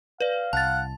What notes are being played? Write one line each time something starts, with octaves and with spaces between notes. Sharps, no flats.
B4 D5 F5
C2 F#5 A5 A6